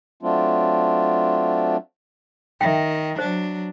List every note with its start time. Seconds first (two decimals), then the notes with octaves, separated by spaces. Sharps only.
0.23 F#3 A3 C4 D4 F4
2.61 D#3 E5 G5
3.19 F#3 D4 C5